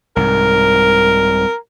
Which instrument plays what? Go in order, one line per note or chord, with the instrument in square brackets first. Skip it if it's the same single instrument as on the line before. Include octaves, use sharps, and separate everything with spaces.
[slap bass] C2 G#2 [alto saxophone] A#4